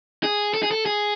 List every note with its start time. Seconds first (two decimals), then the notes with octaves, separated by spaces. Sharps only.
0.24 G#4
0.54 A4
0.63 G#4
0.71 A4
0.86 G#4